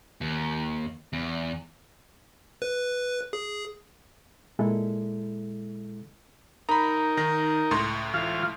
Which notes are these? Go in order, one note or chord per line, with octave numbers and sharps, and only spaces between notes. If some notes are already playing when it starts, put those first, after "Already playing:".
D#2
E2
B4
G#4
A#2 G#3 E4 A4
D#4 A#4 A#5 B5
D#3 A#6
C#2 A2 C6
E3 F4 F5